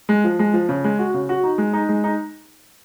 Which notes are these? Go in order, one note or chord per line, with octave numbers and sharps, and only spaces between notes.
G#3
F3
G#3
F3
C#3
G#3
F#4
C#3
F#4
D#4
G#3
D#4
G#3
D#4